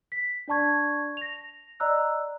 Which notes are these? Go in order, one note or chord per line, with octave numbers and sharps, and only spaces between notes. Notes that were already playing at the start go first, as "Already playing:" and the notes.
B6
D4 D5 A5 C#6 G#6
A#6 F7
D5 D#5 A#5 E6 F#6